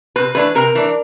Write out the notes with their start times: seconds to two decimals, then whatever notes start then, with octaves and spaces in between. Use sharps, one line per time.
0.16 C3 B4
0.35 E3 A3 D4 B4
0.55 C3 A#4
0.75 E3 A3 D4